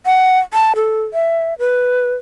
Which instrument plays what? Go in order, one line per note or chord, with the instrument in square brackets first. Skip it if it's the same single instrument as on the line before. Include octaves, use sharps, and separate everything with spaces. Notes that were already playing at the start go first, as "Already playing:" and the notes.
[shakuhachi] F#5
A5
A4
E5
B4